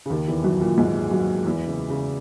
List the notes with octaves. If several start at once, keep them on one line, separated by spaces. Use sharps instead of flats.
C#3
D#2 D#3
E2 E3
F#2 F#3
A#2 A#3
G#2 G#3
F#2 F#3
E2 E3
C#3
C#3